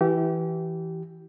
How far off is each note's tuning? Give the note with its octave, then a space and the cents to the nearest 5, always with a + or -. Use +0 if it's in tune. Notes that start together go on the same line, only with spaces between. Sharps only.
E3 +0 G4 -30